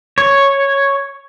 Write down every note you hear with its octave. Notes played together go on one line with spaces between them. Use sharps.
C#5